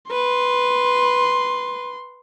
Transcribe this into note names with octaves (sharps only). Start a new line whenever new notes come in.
B4 C6